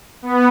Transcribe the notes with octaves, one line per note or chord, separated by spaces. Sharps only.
B3